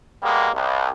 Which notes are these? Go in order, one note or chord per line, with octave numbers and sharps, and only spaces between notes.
B2 G3 G#3 A#3
C2